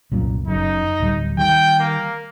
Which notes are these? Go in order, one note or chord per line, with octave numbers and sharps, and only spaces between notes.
C2 F#2 A#2
F#1 F#2 D#4
D1 G3
D#3 G3 G5
A#3